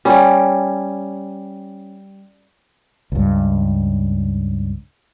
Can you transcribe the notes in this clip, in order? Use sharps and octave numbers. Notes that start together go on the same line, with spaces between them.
G3 C#4
C#2 G2